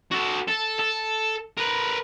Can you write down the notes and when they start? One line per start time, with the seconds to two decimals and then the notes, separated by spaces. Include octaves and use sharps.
0.11 F#4 A4
0.48 A4
0.79 A4
1.58 A#4 B4